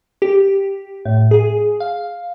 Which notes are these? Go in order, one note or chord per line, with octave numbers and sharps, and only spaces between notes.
G4
A2
G#4
F5